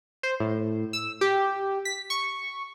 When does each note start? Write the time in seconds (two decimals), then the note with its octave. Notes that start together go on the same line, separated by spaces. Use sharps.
0.23 C5
0.40 A2
0.93 E6
1.21 G4
1.85 B6
2.10 C#6